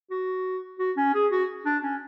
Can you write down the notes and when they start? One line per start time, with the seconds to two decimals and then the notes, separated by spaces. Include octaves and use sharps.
0.11 F#4
0.79 F#4
0.97 C#4
1.14 G#4
1.32 F#4
1.66 D4
1.83 C#4